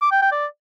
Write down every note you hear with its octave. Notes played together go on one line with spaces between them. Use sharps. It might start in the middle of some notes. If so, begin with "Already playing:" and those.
D6
G5
G5
D5